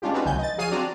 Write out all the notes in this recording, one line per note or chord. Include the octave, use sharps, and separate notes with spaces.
G#3 C#4 D4 F4 G4
C4 C#4 D#4 F#4 B4
C2 D3 F#3 A3 G#5 G6
D#5 A6
F3 F#3 G#4 F5 C7 D#7
C4 D4 F#4 D5 A#5